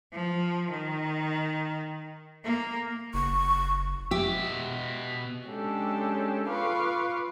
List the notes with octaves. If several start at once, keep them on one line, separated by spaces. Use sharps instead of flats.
F3
D#3
A#3
F#1 C#6
B2 G4 E5
G#3 C#4 D4 G4 A4
F4 B4 F5 C#6 D6